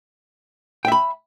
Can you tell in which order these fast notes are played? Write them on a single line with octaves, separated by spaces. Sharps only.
G5 E5 B5